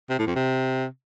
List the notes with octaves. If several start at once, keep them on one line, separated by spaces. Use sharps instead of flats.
C3
A2
F2
C3